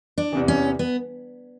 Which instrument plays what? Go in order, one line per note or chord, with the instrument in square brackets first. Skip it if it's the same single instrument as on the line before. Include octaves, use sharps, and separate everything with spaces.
[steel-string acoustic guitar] D4
[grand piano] E2 C3 E3
[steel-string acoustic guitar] C#4
B3